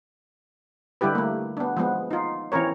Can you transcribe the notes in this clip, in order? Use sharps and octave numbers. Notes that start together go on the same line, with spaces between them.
D3 G3 E4 G4 B4
A3 A#3
B3 D4
F3 G#3 B3
D#4 F4
E3 C4 C#4 A#4 C#5